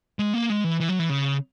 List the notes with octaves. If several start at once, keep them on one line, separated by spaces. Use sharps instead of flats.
G#3
A#3
G#3
E3
E3
F#3
E3
C#3